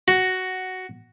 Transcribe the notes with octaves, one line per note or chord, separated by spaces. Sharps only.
F#4